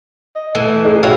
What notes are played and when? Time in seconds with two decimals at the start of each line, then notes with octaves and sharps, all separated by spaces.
0.35 D#5
0.55 E3 A3 D#7
0.85 D#4 G#4
1.03 F#3 E4 C#5 F5 G5